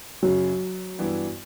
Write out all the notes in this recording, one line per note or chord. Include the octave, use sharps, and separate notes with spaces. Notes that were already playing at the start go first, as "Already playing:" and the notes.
F#1 F#2 C#3 F#3
G2 E3 G3 B3 E4